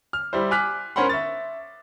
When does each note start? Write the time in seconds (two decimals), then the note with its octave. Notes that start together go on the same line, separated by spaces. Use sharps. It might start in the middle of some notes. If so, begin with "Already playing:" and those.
0.13 F6
0.33 G3 E4 C5
0.51 G#5 D6 F6 F#6 B6
0.96 C#4 A#4 C5 F#5 B5 C6
1.09 E5 C#6 A6